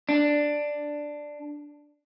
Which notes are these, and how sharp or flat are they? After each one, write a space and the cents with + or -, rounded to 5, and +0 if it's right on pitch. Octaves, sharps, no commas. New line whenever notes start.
D4 +5